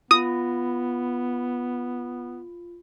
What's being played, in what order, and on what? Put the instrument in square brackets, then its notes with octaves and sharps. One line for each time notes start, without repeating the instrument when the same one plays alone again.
[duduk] B3 [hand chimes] F4 [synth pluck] D#6